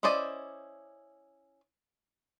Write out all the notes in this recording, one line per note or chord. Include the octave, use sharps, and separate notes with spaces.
C#4 E4 C5 D5 D#5